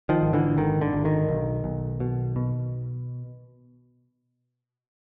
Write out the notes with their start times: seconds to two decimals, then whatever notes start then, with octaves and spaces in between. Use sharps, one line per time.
0.09 D#3 F3
0.21 G#1
0.33 D3 E3
0.57 G#1 D#3
0.81 D3
0.93 G#1
1.05 D#3
1.29 B1
1.64 B1
2.00 B2
2.36 B2